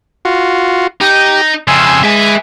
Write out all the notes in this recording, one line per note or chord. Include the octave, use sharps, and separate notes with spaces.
F4 F#4
D#4 G4
F2 C#3 G#5 C6 E6
G#3 E5 G#5